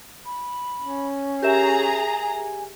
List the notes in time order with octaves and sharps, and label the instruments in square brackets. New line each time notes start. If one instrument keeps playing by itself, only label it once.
[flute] B5
[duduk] C#4
[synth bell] G4 A#4 E5 [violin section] G#4 A#5 [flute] G#5